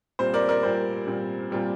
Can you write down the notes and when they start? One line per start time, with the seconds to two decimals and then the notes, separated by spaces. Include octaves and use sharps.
0.19 A#2 G3 C4 C5
0.34 A#4 D5
0.48 A#4 D5
0.63 A#2 G3 C4 C5
1.07 A#2 G3 C4
1.50 A#2 G3 C4